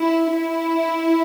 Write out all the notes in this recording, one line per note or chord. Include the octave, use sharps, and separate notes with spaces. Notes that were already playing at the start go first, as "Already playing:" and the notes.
Already playing: E4
E4